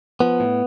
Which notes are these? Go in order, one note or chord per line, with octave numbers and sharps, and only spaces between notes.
F3 B3
A2